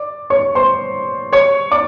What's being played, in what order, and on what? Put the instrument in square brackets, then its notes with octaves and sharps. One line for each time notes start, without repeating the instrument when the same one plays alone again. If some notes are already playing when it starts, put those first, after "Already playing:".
Already playing: [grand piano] D5 D6
C#5 C#6
C5 C6
C#5 C#6
D5 D6